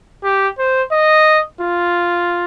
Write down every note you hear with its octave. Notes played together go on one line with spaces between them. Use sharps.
G4
C5
D#5
F4